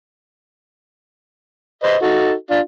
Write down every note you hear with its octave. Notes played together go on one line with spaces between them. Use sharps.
B4 C5 D#5
D#4 F#4 A4
D4 F4